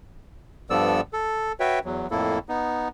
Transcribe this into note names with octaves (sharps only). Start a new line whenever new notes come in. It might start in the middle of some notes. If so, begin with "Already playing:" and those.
G2 F3 B3 A4 D5 E6
A4
F#4 B4 C#5 E5 G5
E2 F#3
F2 A2 A#3 E4 A4
B3 D#4